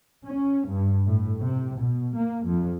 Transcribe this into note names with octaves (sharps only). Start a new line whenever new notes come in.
C#4
G2
A2
C3
B2
A#3
F2